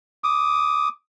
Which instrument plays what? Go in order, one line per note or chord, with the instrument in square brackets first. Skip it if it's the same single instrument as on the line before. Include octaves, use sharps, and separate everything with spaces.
[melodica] D6 D#6